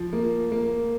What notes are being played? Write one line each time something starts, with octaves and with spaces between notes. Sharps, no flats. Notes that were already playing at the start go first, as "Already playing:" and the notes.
Already playing: F3
A#3
A#3